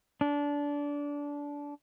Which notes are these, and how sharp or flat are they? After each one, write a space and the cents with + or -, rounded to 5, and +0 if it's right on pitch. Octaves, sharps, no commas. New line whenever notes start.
D4 -20